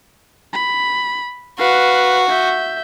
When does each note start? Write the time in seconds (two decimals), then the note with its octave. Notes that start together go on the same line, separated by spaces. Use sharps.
0.53 B5
1.59 F#4 B4 F5
2.30 E5 G6